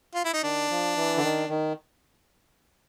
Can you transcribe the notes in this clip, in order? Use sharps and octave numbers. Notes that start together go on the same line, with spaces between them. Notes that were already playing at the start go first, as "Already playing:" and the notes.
F4
E4
D#4
D#3 D4
F3
E3
D3
D#3
D#3